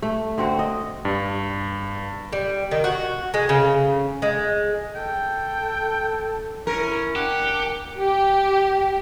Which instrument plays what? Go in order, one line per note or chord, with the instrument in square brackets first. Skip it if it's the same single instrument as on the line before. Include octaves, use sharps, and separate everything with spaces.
[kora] A3
D3 C4 F#4
D#5
[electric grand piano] G2
[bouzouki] G3
D#3
F#4
G#3
C#3
G#3
[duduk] A4 [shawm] G5
[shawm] C#4 [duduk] E4 [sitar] A#4
[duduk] D4 [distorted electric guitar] G4 [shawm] F#5
[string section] G4